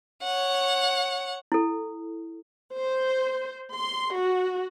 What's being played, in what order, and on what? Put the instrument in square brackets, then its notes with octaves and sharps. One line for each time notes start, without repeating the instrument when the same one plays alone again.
[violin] C#5 F#5
[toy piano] E4 A4
[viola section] C5
C6
F#4